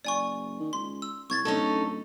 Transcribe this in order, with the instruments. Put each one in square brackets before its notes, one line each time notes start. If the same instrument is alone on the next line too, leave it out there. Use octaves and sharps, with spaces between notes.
[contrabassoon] F#1 [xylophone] D5 G#5 C#6
[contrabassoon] D#3
[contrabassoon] C#2 [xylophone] C6
[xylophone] E6
[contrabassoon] C2 [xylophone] C#6 G#6 A6
[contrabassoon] D1 [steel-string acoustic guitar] C#4 D#4 A4